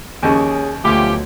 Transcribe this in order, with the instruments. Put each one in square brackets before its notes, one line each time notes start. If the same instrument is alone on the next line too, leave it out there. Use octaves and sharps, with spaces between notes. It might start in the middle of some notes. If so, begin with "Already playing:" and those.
[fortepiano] D#2 C#3 [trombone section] C#4 G#4
[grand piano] D2 [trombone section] B2 F3 F#3 [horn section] C#4 F4 G4